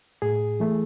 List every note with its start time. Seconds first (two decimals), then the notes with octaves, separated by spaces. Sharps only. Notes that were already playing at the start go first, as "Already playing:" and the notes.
0.22 A2 G#4
0.60 E3 A3